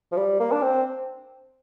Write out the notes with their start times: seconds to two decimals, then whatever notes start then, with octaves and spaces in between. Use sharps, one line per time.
0.12 F3
0.17 G3
0.40 A#3
0.52 D4
0.62 C4